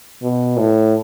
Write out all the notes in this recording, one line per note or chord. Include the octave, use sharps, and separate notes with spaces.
B2
A2